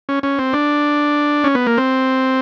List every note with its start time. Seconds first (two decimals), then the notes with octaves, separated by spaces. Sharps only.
0.09 C#4
0.23 C#4
0.39 C4
0.53 D4
1.44 C#4
1.55 B3
1.67 A#3
1.78 C4